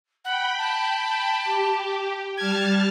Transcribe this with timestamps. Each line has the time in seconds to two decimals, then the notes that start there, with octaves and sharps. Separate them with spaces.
0.24 F#5 G5 B5
0.58 A5
1.44 G4
2.37 G3 A5 F6 G#6